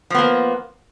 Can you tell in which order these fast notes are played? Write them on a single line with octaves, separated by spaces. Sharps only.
F3 B3 A#3